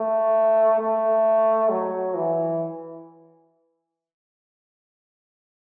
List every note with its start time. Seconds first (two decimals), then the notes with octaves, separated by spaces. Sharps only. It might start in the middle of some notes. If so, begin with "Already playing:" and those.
Already playing: A3
0.79 A3
1.70 F#3
2.16 E3